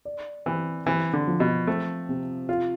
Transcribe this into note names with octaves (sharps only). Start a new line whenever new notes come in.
D5
E3 C4
E3 C4
D3
F3
B2
A3 C4
C3
F4